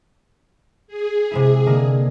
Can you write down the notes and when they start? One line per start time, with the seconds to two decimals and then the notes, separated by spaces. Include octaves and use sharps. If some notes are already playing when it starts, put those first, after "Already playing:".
0.87 G#4
1.31 C3 G#3 E4
1.66 D3 A#3 D#5